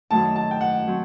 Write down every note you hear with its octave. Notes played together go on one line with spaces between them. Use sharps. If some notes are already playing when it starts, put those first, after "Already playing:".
F#2 D#3 F#3 A3 D#4 A5
A5
G5
F#5
F#3 C4